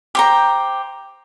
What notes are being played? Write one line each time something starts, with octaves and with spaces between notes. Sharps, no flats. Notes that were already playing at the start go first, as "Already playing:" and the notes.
G4 C5 A#5